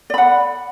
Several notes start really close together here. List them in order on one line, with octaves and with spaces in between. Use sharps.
D5 B5 F#5